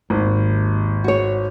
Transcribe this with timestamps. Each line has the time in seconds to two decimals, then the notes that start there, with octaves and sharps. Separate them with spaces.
0.10 G#1 D#2
1.04 F#4 C#5